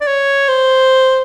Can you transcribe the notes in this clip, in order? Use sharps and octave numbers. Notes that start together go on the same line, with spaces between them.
D5
C#5
C5